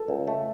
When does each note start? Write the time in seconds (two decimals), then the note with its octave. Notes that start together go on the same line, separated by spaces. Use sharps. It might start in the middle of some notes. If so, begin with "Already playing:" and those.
Already playing: A4
0.08 C#2
0.27 A3